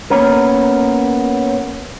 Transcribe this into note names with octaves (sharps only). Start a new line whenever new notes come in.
A#3 B3 C#4 A#4